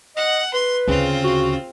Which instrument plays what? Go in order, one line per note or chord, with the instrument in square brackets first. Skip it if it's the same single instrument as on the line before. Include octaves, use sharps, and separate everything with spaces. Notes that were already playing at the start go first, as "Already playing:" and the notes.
[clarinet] D#5 [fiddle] F#5
[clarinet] B4 [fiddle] C6
[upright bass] D2 [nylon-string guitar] C#3 [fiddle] C4 F4
[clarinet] F#4